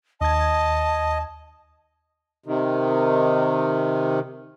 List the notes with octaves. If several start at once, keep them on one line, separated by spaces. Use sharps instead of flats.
D#2 D#5 A5 G#6
C3 D#3